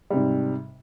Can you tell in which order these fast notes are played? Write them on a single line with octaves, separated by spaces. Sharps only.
G3 C3 G#2